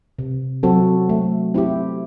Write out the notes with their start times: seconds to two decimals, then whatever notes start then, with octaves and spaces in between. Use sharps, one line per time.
0.19 C3
0.63 F#3 C4 F#4 A4
1.09 A3
1.54 C4 E4 G4